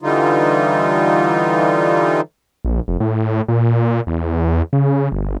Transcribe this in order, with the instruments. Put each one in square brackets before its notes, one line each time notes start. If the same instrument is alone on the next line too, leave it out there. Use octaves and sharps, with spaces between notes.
[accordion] D3 E3 G3 D#4 F4
[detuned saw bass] A#1
F1
A2
A#2
E2
C#3
G1